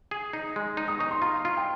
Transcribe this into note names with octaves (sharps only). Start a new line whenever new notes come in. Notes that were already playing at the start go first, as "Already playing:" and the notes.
G#4
D#4
G#3
D#4
D#6
D#4 C#6
C6
F4 A#5
F4
G5